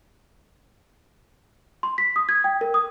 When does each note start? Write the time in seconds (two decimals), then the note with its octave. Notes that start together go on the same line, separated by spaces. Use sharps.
1.83 C6
1.98 B6
2.16 D#6
2.29 G#6
2.44 G5
2.61 A#4
2.74 D#6